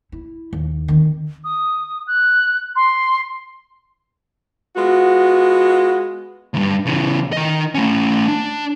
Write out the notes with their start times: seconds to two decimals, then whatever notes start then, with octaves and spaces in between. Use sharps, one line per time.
0.12 E4
0.53 D#2
0.88 D#3 C4
1.44 D#6
2.07 F#6
2.76 C6
4.76 G#3 B3 F4 F#4
6.54 D2 G2
6.87 C#3 E3
7.33 D#3 D#5
7.75 A3 C#4
8.28 D4